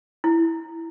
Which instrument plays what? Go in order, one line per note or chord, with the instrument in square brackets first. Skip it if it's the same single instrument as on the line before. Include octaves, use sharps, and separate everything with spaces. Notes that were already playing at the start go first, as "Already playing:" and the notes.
[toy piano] E4